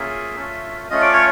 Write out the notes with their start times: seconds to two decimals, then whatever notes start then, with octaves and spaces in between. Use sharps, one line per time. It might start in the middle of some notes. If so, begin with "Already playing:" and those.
Already playing: A#3 C#4 F4 G#4 E5
0.36 A3 C#4 F4
0.90 A3 C#4 F4 D#5
1.02 D5
1.13 C#5